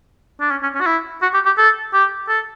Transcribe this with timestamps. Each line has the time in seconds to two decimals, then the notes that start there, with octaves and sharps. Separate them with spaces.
0.41 D4
0.51 C#4
0.62 C#4
0.75 C#4
0.81 F#4
0.86 E4
1.22 F#4
1.34 G4
1.46 G4
1.58 A4
1.94 G4
2.28 A4